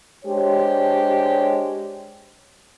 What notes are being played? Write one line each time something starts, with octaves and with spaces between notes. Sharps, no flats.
G#3 D4 G4 C5 C#5